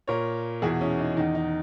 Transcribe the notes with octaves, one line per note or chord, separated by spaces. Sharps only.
A#2 A#4 C#5
E2 B2 E4 G#4
C#4 E4
D#4
E2 D#3 D#4
D#4